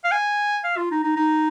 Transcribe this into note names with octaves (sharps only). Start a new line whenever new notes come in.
F5
G#5
F5
F4
D#4
D#4
D#4